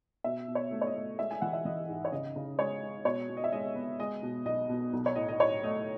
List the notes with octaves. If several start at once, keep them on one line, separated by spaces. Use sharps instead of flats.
B2 E5
B2
C#5
A3
C#5
D#5
A3
G#3 E5
G#5
E3 F#5
E5
E3 D#5
G#2
C#5
C#3 D#5
C#3
G#3 C#5
G#3
B2 C#5
B2
D#5
E5
G#3 D#5
B3
G#3 D#5
B2
B1 D#5
B2
B1
C#5
A2 D#5
D#5
A2 C#5
A3 D#5